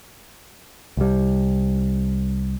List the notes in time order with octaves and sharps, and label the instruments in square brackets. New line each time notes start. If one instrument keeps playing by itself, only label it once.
[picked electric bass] C2 G3